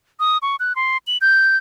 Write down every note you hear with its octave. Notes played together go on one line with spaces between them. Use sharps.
D#6
C#6
F#6
C6
F#7
G6